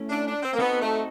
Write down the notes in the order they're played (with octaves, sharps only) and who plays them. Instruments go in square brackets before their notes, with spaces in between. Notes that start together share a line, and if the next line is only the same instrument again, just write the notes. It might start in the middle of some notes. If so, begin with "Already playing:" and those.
Already playing: [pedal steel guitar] A3 C#4 E4
[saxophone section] D4
D4
C4
A#3
[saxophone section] B3 [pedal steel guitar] C4 D#4 F#4 A4
[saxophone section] A3